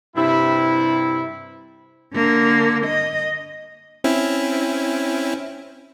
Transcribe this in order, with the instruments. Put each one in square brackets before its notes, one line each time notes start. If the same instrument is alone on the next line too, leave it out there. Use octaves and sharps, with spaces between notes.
[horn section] G2 C3 E4
[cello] D3 A#3
D#5
[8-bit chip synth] C4 C#4 E4